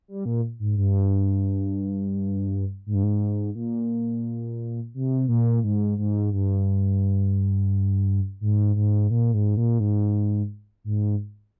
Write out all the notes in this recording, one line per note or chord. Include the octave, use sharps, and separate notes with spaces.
G3
A#2
G#2
G2
G#2
G2
G#2
A#2
C3
A#2
G#2
G#2
G2
G#2
G#2
A#2
G#2
A#2
G#2
G#2